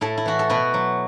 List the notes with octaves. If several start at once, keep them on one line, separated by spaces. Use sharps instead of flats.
A2 E4 A4
E4
E3 F#4
A4
B2 F#4 B4
F#3